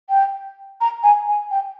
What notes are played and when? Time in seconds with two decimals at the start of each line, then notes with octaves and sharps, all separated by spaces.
0.10 G5
0.81 A#5
1.03 G#5
1.28 G#5
1.51 G5